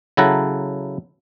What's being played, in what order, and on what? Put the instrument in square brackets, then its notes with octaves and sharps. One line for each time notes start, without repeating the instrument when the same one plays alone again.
[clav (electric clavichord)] C#3 F#3 E4 A4 F#5 A#5